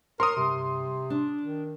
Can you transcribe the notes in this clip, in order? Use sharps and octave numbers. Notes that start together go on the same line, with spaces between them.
A#4 C#5 C6 D#6
G2 C3
D4
D#3